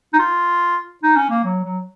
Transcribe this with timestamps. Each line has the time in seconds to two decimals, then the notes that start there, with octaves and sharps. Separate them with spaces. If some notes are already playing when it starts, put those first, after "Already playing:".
0.13 D#4
0.19 F4
1.03 D#4
1.16 C#4
1.30 A#3
1.45 F#3
1.64 F#3